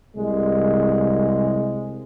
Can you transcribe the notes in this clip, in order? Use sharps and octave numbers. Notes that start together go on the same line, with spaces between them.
C2 G#3